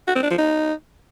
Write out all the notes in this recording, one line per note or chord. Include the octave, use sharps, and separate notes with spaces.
F#4
C4
D4
F3
D#4